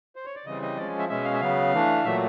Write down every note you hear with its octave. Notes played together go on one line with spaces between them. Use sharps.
C5
C#5
D5
C#3 E3 G3 C4 D#5
D#5
F3 G#3 C#4 D5
E5
B2 G#3 C#4 E5
F5
E5
C#3 F#3 B3 F5
E3 A3 D4
A#2 F#3 A3 E5